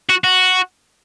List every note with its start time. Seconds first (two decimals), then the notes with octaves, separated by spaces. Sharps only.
0.09 F#4
0.24 F#4